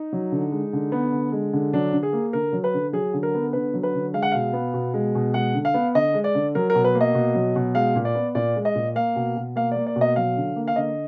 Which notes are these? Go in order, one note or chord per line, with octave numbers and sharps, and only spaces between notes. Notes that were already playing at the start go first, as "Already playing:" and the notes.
Already playing: D#4
F#3
D3
G#3
D3
B3
D3
G#3
D3
F#3 D4
D3
G#4
A#3
D3 A#4
F#3
B4
D3
F#3 G#4
D3
A#4
B3
D3 B4
F#3
B4
D3
G#3 F5
F#5
B2 F5
B3
B2
G#3
B2
G#3 F#5
D3
F5
B3
D3 D#5
G#3
D5
D3
F#3 A#4
A#4
B2
B4
A#3
D#5
B2
F#3
B2
G#3 F5
A#2
D5
B3
A#2 D5
G#3
D#5
A#2
A#3 F5
B2
B2
A#3 F5
A#3 D5
D5
B2
D#5
F#3 F5
D3
A#3
F5
D3 D#5